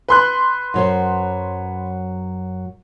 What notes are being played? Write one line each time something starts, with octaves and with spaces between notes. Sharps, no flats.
B4 C6 F#6
F#2 F#3 C5